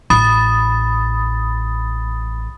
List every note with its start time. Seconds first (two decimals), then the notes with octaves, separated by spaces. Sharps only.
0.10 A1 B5 D#6 A6